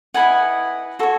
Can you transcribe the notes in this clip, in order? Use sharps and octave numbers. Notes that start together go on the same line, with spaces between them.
E4 G#4 B4 D#5 F#5 G#5
F#4 A4 C#5